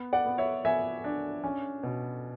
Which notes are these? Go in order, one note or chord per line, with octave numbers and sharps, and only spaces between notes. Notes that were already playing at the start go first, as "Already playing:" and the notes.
Already playing: B3
D5 F#5
B3
C#5 E5
B3 E5 G#5
D4
C#4
B2